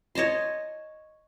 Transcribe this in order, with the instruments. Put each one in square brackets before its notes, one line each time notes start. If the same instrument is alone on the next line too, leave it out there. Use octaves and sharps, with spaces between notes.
[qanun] C#5 D#5 A5 C6